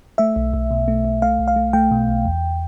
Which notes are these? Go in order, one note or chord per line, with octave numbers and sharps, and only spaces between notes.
A3 E5
B1
B1
B2
A3
B1
A3 F5
B1
F5
A3
A3 G5
B2
B1
E2